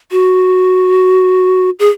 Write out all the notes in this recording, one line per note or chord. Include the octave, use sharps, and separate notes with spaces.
F#4
G#4